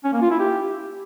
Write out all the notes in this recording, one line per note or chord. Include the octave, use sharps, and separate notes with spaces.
C#4
A#3
F4
E4
G4